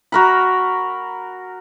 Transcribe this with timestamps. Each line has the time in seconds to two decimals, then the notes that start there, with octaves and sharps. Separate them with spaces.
0.12 F#4 A#4 B5